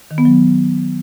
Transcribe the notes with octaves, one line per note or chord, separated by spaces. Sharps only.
D#3
B3
F#3